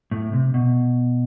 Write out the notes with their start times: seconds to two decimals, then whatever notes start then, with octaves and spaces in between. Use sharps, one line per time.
0.11 A2
0.33 C3
0.54 B2